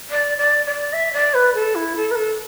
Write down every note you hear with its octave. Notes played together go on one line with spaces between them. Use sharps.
D5
D5
D5
E5
D5
B4
A4
E4
A4
B4
A4